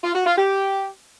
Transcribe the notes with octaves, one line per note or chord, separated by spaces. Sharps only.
F4
F#4
F4
G4